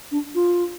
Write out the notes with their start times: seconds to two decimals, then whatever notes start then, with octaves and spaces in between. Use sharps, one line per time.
0.11 D4
0.35 F4